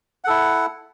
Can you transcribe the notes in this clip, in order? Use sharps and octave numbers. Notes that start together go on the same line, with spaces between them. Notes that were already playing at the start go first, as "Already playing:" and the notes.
E4 A4 F#5